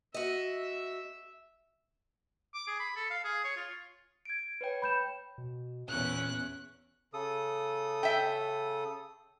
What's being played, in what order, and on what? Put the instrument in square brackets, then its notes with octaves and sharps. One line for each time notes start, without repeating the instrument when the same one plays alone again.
[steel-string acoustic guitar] F#4 D#5 [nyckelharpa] E5
[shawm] D6
G#4
B5
A4
F5
G#4
C#5
F4
[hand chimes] G#6 D7
B4 C#5 G5
[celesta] B5 G6 E7
[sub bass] B2
[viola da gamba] E2 C#4 [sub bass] A#2 [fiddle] F#6
[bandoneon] C#3 A4 D#6
[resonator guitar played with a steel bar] E5 G5